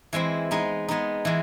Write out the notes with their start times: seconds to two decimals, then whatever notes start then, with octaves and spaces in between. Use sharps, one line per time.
0.13 E3 G#3 C4 E4
0.51 G#3 B3 D#4
0.88 G#3 B3 D#4
1.25 E3 G#3